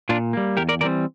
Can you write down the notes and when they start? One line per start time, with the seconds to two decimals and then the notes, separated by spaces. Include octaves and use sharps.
0.09 A#2 D4 F4
0.33 G3 A#3
0.57 E2 G4 A#4
0.69 A#4 D5
0.81 E3 G3 C4 A#4 D5